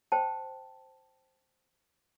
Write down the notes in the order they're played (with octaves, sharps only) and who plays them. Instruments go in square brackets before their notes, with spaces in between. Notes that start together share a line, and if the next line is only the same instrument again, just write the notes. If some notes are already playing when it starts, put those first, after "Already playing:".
[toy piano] C5 G5 A5